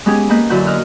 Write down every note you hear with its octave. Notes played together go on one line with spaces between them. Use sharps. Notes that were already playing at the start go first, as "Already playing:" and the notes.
G#3 B3 C#4 G4 G#4
A#3 B4 D#5 G6
F#2 D3 E4 F#4 G6
D#5 F6 F#6